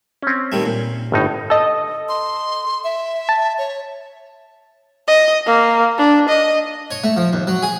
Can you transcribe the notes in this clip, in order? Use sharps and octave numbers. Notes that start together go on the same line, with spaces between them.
C4 C#4
D#3 G3 A3
A#2
G1 A2 D#4
A4 D#5
C6
E5
A5
C#5
D#5
A#3
D4
D#5
C#5
A3
F3
D#2
F#3
G#4